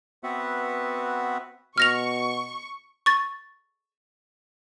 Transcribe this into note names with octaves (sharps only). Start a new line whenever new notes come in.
B3 C4 F#4 B4 E5 F#5
B2 C#6 F6 A#6 F7
C#6 A6